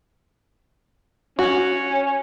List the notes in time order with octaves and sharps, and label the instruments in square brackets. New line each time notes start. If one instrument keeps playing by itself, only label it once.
[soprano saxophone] C#4 [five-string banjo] F#4